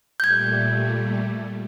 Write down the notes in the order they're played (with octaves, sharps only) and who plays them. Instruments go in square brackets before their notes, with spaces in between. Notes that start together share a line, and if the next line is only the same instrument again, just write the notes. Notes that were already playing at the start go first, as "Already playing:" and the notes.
[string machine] A#2 G3 A3 [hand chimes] G6 G#6